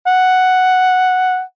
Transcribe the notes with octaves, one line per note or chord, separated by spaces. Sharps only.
F#5